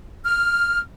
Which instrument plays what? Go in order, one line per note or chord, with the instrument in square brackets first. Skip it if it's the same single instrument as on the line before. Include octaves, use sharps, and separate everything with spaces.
[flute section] F6